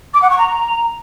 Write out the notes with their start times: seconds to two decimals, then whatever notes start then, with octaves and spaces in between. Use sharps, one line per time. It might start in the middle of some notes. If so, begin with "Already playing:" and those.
0.14 D6
0.22 F#5
0.30 C#6
0.38 A#5